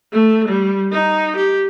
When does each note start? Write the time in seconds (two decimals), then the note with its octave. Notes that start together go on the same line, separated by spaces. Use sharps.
0.13 A3
0.48 G3
0.92 D#4
1.36 G4